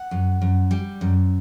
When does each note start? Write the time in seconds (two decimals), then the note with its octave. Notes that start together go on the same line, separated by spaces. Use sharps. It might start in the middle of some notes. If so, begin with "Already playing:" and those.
Already playing: F#5
0.11 F#2
0.41 F#2
0.71 G3
1.01 F#2